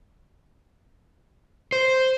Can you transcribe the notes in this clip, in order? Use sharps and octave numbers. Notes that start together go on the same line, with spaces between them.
C5